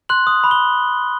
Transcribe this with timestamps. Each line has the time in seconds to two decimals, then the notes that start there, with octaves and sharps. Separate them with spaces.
0.09 C6 F#6 F#7
0.27 D#6
0.44 B5
0.51 G7